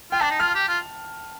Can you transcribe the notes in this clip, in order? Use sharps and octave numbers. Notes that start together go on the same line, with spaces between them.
F4 G5
D4 A5
D#4
F4 F6
G4
F4